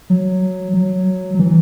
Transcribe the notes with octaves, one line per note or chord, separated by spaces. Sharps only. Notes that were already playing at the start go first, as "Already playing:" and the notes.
F#3
F#3
F#3
E3